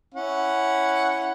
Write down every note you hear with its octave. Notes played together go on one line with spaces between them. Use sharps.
C#4 E4 F#5